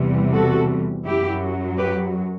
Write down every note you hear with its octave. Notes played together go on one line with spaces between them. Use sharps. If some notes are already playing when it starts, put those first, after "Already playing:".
Already playing: E2 C3 E3 G3
F#4 A4
F#2 F#3 E4 G4
G4 B4